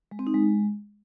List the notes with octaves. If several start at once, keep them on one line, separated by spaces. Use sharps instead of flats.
G#3
C4
D#4
G#3